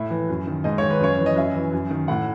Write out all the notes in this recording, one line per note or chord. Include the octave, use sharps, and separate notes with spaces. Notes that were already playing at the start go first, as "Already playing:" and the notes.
Already playing: A2 E5
E3
F#2
D#3
G#2 D#5
D#3 C#5
B4
F#2 C#5
E3
D#5
F#2 E5
E3
F#2
D#3
A2 F#5